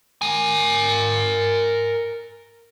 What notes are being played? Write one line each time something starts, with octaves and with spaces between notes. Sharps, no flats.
A#4 G#5